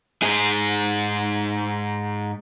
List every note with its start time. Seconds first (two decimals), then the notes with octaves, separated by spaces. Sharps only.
0.22 G#2 G#4